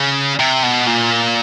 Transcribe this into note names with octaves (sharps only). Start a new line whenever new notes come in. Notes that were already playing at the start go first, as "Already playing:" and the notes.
Already playing: C#3
C3
B2
A#2